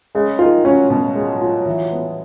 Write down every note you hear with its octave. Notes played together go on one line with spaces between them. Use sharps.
C#3 G#3
D#3 F4
F#3 C#4
B2 F#3
G#3
F4
E3
B3